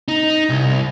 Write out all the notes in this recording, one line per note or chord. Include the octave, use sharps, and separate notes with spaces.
D#4
C2